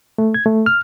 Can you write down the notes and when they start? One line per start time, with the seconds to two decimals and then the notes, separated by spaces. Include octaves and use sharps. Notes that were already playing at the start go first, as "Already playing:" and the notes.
0.18 A3
0.34 G#6
0.46 A3
0.66 F6